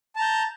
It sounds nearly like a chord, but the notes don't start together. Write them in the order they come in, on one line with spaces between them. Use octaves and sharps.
A5 A#5 G6